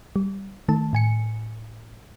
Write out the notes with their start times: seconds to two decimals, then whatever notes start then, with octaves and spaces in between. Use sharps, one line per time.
0.16 G3
0.69 D#3 A3 A5
0.93 A2 G#5 C#7